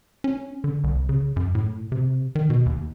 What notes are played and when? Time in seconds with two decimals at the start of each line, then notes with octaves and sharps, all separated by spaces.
0.24 C#4
0.64 D3
0.84 C2
1.09 C#3
1.36 F#2
1.55 A2
1.92 C3
2.35 D#3
2.50 B2
2.66 D#2